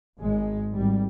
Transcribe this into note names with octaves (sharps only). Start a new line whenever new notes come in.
G#1 G#3
G#1 G3